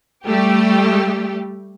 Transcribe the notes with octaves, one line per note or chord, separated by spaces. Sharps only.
G3 A3 G4